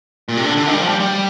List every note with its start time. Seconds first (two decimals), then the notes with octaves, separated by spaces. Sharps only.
0.29 A#2
0.37 C3
0.45 D3
0.57 D3
0.67 D#3
0.73 G3
0.79 F3
0.89 G3
1.00 G3